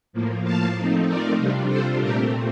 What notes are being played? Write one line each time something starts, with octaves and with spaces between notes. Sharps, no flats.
A2 F3 A#3
F5 A5
F3 A3 C4 D#4
A#4 D5
C3 G3 D4 F4
A4 C5
A#2 A3 C4 G4 A#4